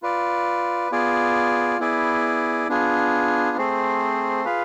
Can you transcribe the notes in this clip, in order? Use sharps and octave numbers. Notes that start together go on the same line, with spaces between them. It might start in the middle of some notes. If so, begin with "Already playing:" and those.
F4 B4 D5
B3 F4 G#4 D5
B3 E4 G#4 D5
B3 D4 F4 G#4
A3 C4 G#4 C5
F4 G#4 B4 F5